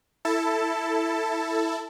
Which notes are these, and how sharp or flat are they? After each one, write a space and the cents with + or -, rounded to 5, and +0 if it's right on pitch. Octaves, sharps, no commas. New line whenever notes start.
E4 +0 A4 +10 A5 +5